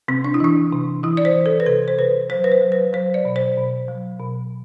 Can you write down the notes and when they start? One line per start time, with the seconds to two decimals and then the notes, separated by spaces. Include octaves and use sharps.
0.08 C3 C4
0.24 D4
0.34 E4
0.40 E3 D4
0.73 C3
1.03 E3 E4
1.17 D5
1.25 C5
1.35 E3
1.46 A4
1.60 B4
1.66 C3 A4
1.88 C5
1.98 C3 B4
2.30 F#3 C5
2.44 B4
2.52 C5
2.61 F#3
2.72 B4
2.93 F#3 C5
3.14 D5
3.25 B2
3.36 C5
3.57 B2
3.88 F#3
4.19 B2